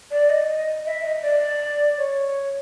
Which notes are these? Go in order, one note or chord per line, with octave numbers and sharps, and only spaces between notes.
D5
D#5
E5
D#5
D5
C#5